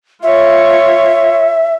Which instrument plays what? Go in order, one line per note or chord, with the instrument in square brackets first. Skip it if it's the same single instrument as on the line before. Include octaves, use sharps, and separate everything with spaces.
[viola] F4 C#5 [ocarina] E5